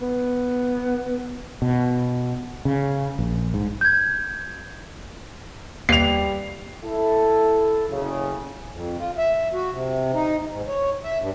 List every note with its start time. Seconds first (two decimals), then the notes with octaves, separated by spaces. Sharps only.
0.01 B3
1.62 B2
2.65 C#3
3.19 A#1
3.54 G#2
3.81 G6 G#6
5.89 D#2 G3 A#3 B4 C7 F7
6.85 E4 A4
7.89 F#1 C#3
8.70 F2
8.99 F4
9.18 E5
9.53 F#4
9.72 C3
10.13 D#4
10.51 G#2
10.68 C#5
11.04 E5
11.20 G2